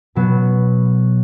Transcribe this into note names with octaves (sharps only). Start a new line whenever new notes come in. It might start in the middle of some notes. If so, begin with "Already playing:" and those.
B2 F#3 B3